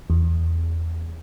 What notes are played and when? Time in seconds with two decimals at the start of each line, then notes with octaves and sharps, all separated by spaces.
0.10 E2